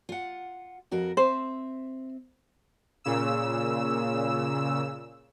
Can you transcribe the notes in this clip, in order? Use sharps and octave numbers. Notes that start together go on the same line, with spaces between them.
F4 F#5
F2 F#4 A#4
C4 C5 E5
A#2 C#3 E6